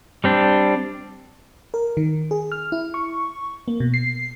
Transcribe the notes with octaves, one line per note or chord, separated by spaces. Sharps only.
G3 C4 D4
A#4
D#3
G#4
F6
E4
C#6
A#3
B2
C7